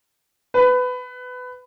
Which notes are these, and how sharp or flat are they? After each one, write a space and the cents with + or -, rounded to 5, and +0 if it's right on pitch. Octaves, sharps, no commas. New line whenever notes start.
B4 +20